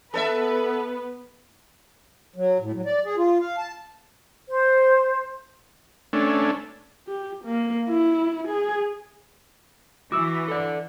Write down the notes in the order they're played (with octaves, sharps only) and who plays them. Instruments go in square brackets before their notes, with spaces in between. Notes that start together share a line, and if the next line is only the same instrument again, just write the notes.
[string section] B3 B4 [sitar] A4 C5 E5
[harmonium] F#3
A2
F#3
D5
G#4
F4
F5
A5
[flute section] C5
[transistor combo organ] A3 C#4 D4
[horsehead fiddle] G4
A#3
E4
G#4
[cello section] E3 [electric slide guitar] F#4 [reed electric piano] D6 E6
[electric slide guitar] A4 D5